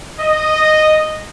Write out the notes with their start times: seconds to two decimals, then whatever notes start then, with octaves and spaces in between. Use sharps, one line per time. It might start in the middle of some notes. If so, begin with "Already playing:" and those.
0.20 D#5